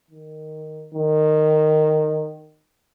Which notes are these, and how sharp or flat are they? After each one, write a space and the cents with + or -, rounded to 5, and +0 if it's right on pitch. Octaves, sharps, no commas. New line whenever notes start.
D#3 -5
D#3 -15